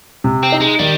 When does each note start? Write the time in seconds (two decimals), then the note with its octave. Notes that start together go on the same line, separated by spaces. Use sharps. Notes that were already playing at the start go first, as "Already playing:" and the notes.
0.24 C3
0.43 C4
0.52 D#4
0.61 G#3
0.79 D#3 G3